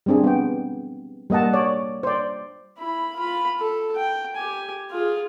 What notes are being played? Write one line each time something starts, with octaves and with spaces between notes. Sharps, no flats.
G3 G#3 C4 D4 G#4
B3 G5
G3 A#3 D#5 F#5 A5
C#5 D5
C5 D5
E4 B5
F4 B5
A4
G5
G4 G#5
F4 G#4